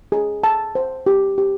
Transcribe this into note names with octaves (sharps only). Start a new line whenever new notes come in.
G#4
A5
C5
G4
G4